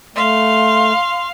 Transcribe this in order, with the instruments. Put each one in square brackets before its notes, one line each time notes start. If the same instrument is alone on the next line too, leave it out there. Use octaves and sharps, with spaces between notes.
[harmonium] A3 [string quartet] F5 [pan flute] C6